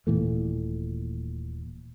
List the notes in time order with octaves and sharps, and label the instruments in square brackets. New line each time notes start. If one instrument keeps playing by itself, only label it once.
[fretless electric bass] D#1 A#2 E3 A3